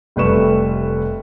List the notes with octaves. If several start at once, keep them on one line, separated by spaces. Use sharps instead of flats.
F1 G3 A3 B4 C#6 E7